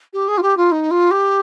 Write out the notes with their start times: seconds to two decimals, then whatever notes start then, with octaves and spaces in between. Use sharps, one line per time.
0.13 G4
0.28 G#4
0.38 F4
0.42 G4
0.57 F4
0.71 D#4
0.91 F4
1.11 G4